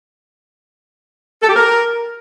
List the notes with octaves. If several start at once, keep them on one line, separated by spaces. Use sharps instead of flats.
A4
G4
A#4